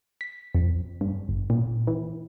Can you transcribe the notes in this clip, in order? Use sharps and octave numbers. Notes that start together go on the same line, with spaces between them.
B6
F2
G2
G1
A#2
E3